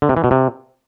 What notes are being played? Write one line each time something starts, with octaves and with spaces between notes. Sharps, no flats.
D3
C3
E3
B2
C3